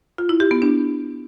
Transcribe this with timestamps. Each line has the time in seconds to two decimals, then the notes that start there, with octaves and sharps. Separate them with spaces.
0.18 F4
0.29 E4
0.40 G4
0.51 B3
0.62 D4